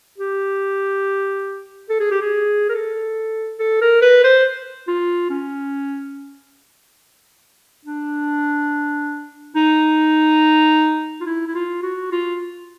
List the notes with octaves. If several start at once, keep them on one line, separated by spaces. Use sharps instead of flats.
G4
A4
G#4
G4
G#4
A#4
A4
A4
A#4
B4
C5
F4
C#4
D4
D#4
F4
E4
E4
F4
F#4
F4